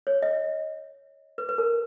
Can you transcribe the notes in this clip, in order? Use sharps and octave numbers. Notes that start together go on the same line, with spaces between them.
C#5
D#5
B4
B4
A#4